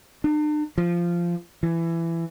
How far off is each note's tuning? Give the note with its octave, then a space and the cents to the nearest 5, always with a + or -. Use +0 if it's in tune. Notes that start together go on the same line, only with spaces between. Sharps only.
D4 +45
F3 -15
E3 +20